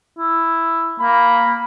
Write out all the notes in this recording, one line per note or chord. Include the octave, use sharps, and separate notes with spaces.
E4
A#3 B5